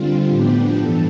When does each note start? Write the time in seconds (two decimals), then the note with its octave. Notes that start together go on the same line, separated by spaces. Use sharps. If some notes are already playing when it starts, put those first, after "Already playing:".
Already playing: D3 G3 C4 F4
0.28 A2 F3 B3 D4 G4
0.77 G2 E3 A4